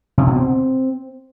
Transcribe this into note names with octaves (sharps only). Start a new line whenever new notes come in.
C3
B2
C4